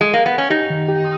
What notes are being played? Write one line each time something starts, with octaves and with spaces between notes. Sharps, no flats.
G#3
A#3
B3
C#4
D#4 G4
D#3
G4